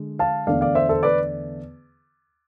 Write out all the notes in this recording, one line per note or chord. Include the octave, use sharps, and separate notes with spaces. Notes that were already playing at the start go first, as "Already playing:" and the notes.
Already playing: D3 G#3
F5 A5
E2 D3 A3 D5 F5
D5 F5
C5 E5
A4 C5
B4 D5